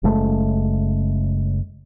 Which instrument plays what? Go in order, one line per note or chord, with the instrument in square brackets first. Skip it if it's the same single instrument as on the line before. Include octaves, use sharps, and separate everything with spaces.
[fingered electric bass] F#1 C#3 G#3 A3